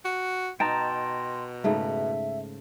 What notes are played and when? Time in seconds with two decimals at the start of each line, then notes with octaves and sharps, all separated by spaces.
0.05 F#4
0.60 B2 D#4 G5 A5 A#5 C6
1.64 G#2 C#3 A3 E5